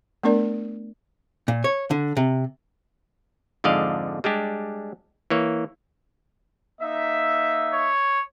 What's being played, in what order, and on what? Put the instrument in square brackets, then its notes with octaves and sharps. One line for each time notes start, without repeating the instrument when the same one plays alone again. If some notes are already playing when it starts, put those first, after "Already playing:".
[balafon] A3 B3 D4 A#4 D5
[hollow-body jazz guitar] A#2
C#5
D3
C3
[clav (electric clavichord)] F2 G#2 D3 D5 D#5 F5
G3 G#3 D4 G4
E3 A#3 C#5
[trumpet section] A#3 D#4 E5
[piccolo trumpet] C#5